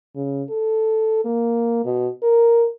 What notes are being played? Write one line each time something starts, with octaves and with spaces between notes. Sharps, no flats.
C#3
A4
A#3
B2
A#4